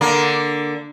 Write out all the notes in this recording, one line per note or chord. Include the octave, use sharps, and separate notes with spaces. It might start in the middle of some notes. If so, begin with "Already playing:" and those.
D3 A#3